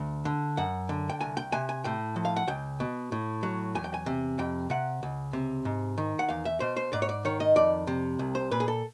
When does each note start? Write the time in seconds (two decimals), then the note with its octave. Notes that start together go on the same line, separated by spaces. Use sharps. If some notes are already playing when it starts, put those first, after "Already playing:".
Already playing: D2
0.25 D3
0.57 F#2 F#5
0.89 D3
1.10 G5
1.21 C2 G#5
1.37 G5
1.52 C3 G#5
1.69 G#5
1.84 A2 G5
2.16 F3
2.25 F5
2.36 F#5
2.48 C#2 G5
2.80 B2
3.12 A2
3.43 F#3
3.75 E2 G#5
3.84 G5
3.94 G#5
4.06 C3
4.39 F2 G5
4.70 C3 F#5
5.03 C#2
5.33 C3
5.65 G#2
5.98 D#3
6.19 F#5
6.29 E2 F5
6.45 E5
6.60 B2 C5
6.77 C5
6.93 G#2 D5
7.02 C#5
7.09 D5
7.25 D#3 C#5
7.40 D#5
7.56 F2 D5
7.87 C3
8.19 C2
8.35 C5
8.51 A#2 B4
8.60 G#4
8.68 A4